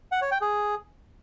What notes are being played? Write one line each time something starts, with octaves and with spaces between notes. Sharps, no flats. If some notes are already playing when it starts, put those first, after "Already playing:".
F#5
C#5
G5
G#4